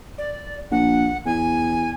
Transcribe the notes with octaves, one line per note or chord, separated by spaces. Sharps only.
D5
A#1 F#5
E2 G#5